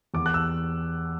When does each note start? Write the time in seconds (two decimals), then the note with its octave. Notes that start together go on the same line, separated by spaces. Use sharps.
0.14 E2 D6
0.26 F#6
0.34 E6